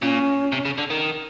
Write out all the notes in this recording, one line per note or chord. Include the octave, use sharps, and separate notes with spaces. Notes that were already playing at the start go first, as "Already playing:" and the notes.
A#2 C#4
C3
C#3
D3
D#3